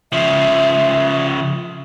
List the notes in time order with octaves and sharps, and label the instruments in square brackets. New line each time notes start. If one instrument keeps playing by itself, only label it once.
[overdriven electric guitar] C#3 F3 [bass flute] E5